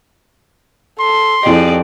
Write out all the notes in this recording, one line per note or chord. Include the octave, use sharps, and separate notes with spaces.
A4 C6
F2 E4 G4 G#4 D5 D#5